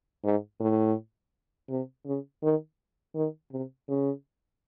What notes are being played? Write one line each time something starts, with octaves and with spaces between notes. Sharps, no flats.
G#2
A2
C3
C#3
D#3
D#3
C3
C#3